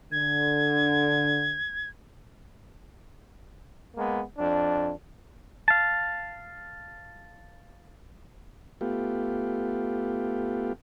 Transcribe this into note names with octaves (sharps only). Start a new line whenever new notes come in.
D3 G#6
G#3 A#3 B3
F2 D4
F5 A5
A3 B3 F4 G4